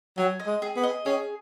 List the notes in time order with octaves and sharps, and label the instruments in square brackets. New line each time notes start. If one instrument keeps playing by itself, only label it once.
[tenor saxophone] F#3 [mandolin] G#5
[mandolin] D#5
[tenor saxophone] G#3
[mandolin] G#4
[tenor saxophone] B3
[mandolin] D#5
[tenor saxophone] C#4 [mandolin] G#4